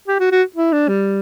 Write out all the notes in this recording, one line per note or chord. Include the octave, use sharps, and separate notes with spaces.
G4
F#4
F#4
E4
D4
G3